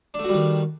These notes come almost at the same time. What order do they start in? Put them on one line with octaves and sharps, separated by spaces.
D4 A3 F#4 G3 D#3